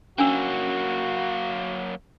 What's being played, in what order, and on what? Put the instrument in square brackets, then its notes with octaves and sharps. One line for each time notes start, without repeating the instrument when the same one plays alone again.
[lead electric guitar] F#3 A#3 [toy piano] C#4 D4 E6 [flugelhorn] F#4